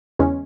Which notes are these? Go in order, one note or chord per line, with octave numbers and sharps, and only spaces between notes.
E2 C#3 G#3 C#4